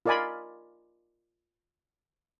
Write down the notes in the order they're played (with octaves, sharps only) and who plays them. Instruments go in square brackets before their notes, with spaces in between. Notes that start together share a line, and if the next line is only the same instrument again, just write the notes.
[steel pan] F4 A#4 D5 D#5 G#5 B5